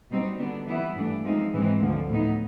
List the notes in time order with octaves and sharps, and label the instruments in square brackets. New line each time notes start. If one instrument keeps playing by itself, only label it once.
[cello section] B2 G3 C4 D#4
D3 G3 B3 D4
E3 G3 B3 E4
G2 E3 A3 D4
F3 G#3 C4 D#4
G#2 E3 G#3 C4
D2 D3 F3
A2 F#3 B3 D#4